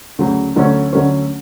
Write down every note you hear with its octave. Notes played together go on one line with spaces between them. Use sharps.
D2 C#3 F#3
D2 D3 F#3 A3 C#4
D2 D3 F#3 A3 C#4